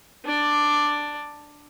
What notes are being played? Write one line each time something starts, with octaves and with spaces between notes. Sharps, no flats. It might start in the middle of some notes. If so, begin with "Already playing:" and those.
D4 D5